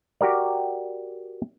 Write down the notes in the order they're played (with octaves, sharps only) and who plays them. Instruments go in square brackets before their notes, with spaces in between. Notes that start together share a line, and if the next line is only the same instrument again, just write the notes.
[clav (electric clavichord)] F#4 G4 A#4 D5